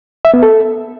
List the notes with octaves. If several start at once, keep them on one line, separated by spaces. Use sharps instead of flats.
E5
B3
A4